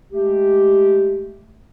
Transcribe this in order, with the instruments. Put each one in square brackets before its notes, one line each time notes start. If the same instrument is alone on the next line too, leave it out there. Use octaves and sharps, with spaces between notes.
[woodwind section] G#3 A3 G4